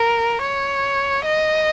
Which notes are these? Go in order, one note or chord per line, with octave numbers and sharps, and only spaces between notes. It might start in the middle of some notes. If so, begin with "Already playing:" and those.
Already playing: A#4
C#5
D#5